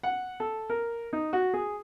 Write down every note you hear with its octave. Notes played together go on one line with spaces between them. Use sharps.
F#5
A4
A#4
D#4
F#4
G#4